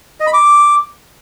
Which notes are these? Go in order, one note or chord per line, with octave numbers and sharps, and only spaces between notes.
D#5
B5
D6